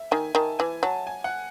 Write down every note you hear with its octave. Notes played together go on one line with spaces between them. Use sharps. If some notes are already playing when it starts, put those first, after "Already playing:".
Already playing: E5
D#3 G#5
D#3 A5
E3 G#5
F#3 A5
G#5
F#5